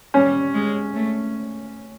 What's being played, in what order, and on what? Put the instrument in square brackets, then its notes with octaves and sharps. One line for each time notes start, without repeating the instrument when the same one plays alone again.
[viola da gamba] G3 [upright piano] C#4
[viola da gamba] G#3
A3